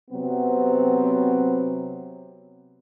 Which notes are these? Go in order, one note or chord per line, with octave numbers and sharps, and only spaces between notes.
C3 F#3 B3 C4